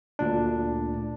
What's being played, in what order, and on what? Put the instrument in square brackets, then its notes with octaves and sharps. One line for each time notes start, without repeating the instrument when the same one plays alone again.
[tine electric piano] D2 A#2 D4